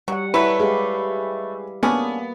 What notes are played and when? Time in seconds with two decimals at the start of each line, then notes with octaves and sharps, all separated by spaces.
0.08 F#3 G3 F#5
0.34 F#3 A3 E4 B4
0.59 G#3 E4 G4 F5
1.83 A#3 B3 C#4 D4 G#4